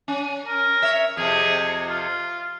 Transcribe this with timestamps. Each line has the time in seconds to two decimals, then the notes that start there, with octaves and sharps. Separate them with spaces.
0.08 C#4
0.46 A#4
0.82 C#5 E5
1.17 F2 C3 G#4
1.89 F4